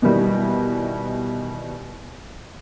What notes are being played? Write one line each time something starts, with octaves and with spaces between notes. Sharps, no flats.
B2 D#3 E3 G3